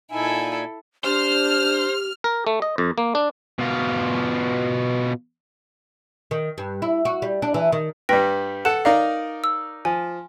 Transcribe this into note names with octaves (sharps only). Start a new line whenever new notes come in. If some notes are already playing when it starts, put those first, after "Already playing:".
A#2 D#4 E4 A4 G#5
D4 G4 C5 F6
A#4
A3
D#5
F2
A#3
D4
B2 F4
D#3
G2
E4
F#4
G3
D4
E3
D#3
G2 G3 B4 G5 A#6
A4 F#5 E7
D#4 A#4 D5 F5
E6
F3 G#5